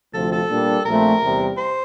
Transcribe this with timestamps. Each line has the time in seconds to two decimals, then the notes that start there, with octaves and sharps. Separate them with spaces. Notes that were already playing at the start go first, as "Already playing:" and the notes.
0.13 D2 C3 F3 A4
0.32 A4
0.49 A#2 G3 A#3 D4
0.85 A#1 A#2 A3 C4 A#4
1.21 E2 C3 G3
1.58 C5